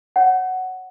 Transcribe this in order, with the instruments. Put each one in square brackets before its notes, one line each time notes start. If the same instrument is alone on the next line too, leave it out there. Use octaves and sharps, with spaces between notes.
[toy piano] C#5 F#5